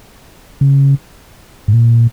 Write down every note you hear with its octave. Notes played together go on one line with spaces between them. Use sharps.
C#3
G#2
A#2